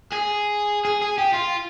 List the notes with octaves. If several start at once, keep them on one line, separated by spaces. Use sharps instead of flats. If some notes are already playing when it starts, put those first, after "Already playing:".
G#4
G#4
G#4
G4
F4